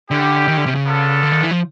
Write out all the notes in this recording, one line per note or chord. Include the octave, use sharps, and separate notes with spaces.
D3 C#4 E4 G4
D#3
D3
C3
C#3
B3 D4 F4 A4
D3
D#3
E3
F3